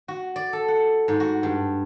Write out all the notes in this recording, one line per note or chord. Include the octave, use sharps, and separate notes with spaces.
F#4
D5
A4
F#5
G#2
F#4
G2